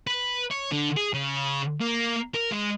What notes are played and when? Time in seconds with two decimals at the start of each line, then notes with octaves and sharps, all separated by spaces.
0.07 B4
0.51 C#5
0.72 D3
0.97 G#4
1.14 C#3
1.81 A#3
2.34 A#4
2.51 G#3